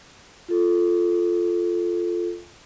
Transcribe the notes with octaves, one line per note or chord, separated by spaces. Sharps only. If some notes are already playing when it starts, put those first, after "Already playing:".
F4 A4